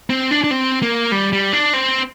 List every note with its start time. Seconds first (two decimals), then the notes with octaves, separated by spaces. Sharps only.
0.10 C4
0.31 D4
0.44 D4
0.51 C4
0.82 A#3
1.12 G3
1.32 G3
1.53 D4
1.74 C4